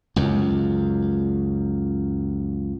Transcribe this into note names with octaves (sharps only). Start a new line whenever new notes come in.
C#2 F#2